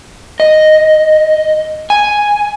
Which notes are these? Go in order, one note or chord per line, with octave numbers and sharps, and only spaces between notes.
D#5
G#5